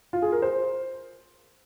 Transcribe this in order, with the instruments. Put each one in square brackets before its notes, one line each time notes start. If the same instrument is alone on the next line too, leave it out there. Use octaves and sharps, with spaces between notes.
[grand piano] F4
G#4
A#4
C5